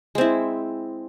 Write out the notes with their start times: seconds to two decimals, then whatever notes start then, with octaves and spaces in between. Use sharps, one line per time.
0.15 G#3
0.18 C4
0.21 E4